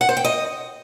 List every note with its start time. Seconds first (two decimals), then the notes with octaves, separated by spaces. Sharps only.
0.01 F#5
0.09 C5
0.17 G5
0.25 D#5